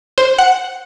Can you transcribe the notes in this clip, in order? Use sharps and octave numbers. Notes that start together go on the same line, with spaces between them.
C5
F#5